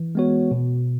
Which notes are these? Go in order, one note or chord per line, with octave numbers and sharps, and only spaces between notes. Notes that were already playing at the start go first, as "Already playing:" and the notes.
Already playing: E3
G#3 B3 F#4 C#5
B2